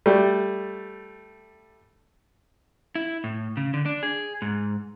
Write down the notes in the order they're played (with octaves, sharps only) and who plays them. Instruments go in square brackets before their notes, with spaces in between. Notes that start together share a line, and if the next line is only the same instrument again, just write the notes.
[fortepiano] G3 A3
[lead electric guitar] E4
A2
C#3
D3
D4
G#4
G#2